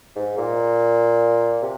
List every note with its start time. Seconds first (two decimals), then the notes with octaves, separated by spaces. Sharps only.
0.16 G#2
0.38 A#2
1.62 C3